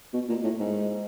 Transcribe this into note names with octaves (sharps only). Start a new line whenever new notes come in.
B2
A#2
A2
G#2